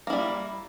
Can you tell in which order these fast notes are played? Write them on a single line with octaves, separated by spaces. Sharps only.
A#3 E4 G3